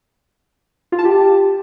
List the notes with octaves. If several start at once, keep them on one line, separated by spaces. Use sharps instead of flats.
F4
A5
G4